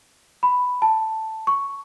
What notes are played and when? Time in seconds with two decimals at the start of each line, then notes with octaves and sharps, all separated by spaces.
0.43 B5
0.82 A5
1.47 C#6